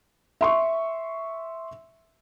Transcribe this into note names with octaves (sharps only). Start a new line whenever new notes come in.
E5 C6 C#6